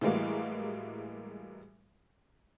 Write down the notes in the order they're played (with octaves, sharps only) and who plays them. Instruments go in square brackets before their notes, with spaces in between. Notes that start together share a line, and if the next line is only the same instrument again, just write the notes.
[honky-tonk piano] A2 E3 G3 G#3 A#3 F#4